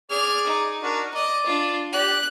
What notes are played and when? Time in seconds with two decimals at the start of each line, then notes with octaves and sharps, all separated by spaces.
0.11 G#4 D5 F6
0.47 D#4
0.83 D4 F#4 A#4
1.14 D5 D#5
1.46 D4 F4
1.93 G4 D5 F#6